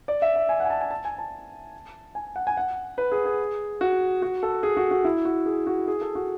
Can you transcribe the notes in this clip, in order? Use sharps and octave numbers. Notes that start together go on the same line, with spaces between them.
D5
E5
E5
G#5
F#5
G#5
A5
G#5
A5
G#5
A5
G#5
F#5
G#5
F#5
B4
G#4
G#4
F#4
F#4
A4
G#4
F#4
F#4
E4
F#4
G#4
F#4
G#4
A4
F#4